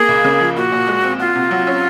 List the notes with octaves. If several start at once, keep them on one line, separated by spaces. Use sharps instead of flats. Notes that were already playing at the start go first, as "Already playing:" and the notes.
Already playing: A#3 G#4
C#2
C#3
F3
A#2 F#4
A#2
G#3
C4
F4 F#4
C3
F#3
C#4